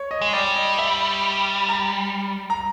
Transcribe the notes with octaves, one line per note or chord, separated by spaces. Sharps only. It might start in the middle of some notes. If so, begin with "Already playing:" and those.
Already playing: C#5
D#5
G#3
G3 D5
D#5
E5
A#5
A#5